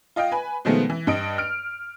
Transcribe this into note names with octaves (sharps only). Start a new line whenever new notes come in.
F4 D#5 F5 G5
B4 G#5
B2 D#3 F3 G#3 A3 B3
E3
G2 D#5 D7
F6 D7